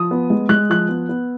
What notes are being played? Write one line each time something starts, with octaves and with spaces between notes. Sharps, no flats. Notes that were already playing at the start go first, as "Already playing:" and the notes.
Already playing: F3 D#6
B3
G#3
G#3 F#6
F3 F#6
B3
B3